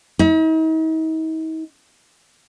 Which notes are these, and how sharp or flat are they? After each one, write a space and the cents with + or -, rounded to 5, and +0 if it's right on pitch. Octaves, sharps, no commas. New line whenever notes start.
D#4 +45